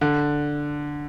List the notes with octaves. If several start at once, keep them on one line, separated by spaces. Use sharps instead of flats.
D3